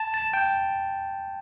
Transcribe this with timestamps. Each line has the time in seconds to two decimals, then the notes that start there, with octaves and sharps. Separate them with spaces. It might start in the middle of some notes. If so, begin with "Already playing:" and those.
Already playing: A5
0.14 A5
0.34 G5